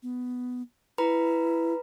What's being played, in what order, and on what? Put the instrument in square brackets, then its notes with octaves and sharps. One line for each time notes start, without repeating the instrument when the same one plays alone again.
[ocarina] B3
[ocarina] E4 [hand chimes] B4 A#5 B5